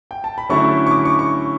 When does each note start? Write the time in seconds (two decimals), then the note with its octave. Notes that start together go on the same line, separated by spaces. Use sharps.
0.11 G5
0.24 A5
0.38 B5
0.49 D3 F#3 A3 C#4 E4 C#6
0.87 C#6
0.91 D6
1.05 C#6
1.19 C#6